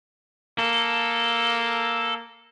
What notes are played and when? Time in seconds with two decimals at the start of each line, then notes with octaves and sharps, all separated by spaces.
0.59 A#3 A4